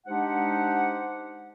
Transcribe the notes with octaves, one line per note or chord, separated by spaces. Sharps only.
G#3 D4 D#4 G4 C5 F#5